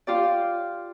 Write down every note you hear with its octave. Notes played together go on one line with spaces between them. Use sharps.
F4 G4 D5